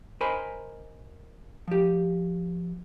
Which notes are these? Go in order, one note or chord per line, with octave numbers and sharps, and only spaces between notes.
A#4 C5 D#5 G#5 B5 C6
F3 G4